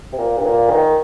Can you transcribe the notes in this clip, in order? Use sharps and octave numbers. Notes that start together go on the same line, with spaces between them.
C3
A#2
G2
A#2
D#3